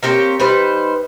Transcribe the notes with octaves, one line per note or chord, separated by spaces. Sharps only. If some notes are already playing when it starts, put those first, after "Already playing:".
A#3 C4 G4 C#5
G3 D#4 B4 C5